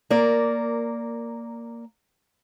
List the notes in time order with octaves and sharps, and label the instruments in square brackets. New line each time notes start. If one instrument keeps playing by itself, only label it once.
[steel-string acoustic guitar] A#3 A#4 D5